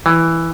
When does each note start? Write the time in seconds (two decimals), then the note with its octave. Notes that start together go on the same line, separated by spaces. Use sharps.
0.06 E3